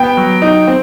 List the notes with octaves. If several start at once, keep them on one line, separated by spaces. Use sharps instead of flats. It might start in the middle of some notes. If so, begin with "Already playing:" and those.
Already playing: B3 G5
F#3
D#4
C4